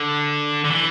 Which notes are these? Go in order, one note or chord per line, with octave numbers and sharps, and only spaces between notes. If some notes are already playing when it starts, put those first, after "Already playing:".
Already playing: D3
D3
E3